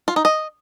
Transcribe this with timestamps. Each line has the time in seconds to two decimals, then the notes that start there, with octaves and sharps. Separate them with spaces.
0.08 F4
0.16 D#4
0.25 D#5